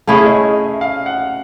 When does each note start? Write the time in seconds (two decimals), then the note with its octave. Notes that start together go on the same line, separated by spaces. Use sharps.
0.07 A3 C#4 E4 G#4 F5
0.26 D#5
0.44 D#5
0.63 E5
0.81 F5
1.06 F#5